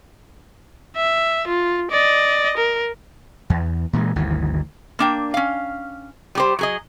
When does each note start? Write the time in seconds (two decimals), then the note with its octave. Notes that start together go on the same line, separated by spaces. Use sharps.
0.96 E5
1.48 F4
1.91 D5 D#5
2.57 A#4
3.50 E2
3.93 A#2 E3 G3 G#3
4.15 G1 D2 D#3 E3
4.99 A#3 D4 G5
5.34 C#4 F5
6.35 G3 G4 C5
6.59 F#3 G#4 D#5